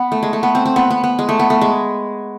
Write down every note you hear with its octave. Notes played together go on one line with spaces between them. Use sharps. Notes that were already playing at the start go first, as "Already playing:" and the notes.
Already playing: B3
A3
G#3
A3
B3
C4
C4
B3
B3
B3
G#3
A3
B3
A3
G#3